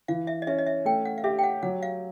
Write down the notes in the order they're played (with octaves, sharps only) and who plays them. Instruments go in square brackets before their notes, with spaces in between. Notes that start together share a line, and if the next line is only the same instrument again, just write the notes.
[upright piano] E3 [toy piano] F5
[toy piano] E5
D#5
[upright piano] C#4 [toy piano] E5
[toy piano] D#5
E5
[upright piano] A3 [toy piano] G5
[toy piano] F#5
F5
[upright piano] G4 [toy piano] E5
[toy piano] G5
F#5
[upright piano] F#3 [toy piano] F#5
[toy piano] F5